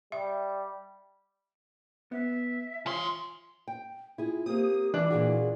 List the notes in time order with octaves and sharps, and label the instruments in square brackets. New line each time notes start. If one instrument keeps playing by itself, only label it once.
[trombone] G3 [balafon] E5
[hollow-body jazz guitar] B3 [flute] E5
[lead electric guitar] E3 C6 [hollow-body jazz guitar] F4 C#5
[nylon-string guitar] G5
[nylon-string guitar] E4 G#4 [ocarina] F4
[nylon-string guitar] A#3 C4 [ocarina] G4 [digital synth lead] D#6
[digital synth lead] E3 [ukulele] D4 [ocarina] E5
[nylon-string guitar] A#2 F4 F#4 [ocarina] G#4